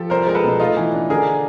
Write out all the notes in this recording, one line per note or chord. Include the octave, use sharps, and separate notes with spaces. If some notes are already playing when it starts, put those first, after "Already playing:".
Already playing: F3 G4 A4
C2 A#4 C5
G#3 A#4
A4 B4
B2
A3 D#4 F4
E3
D4
D3 G#4 A#4